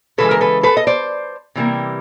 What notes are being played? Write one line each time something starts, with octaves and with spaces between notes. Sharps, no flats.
C#3 E3 G#3 A4 B4
A#4
A4 B4
A4 B4
D#5
C5 D5
C3 E3 G3 A#3